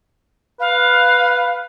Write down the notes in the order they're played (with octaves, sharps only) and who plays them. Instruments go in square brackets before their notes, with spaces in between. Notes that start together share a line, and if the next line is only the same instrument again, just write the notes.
[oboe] B4 [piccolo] F5